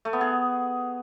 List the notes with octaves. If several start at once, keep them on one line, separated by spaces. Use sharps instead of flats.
A3
B3
G#4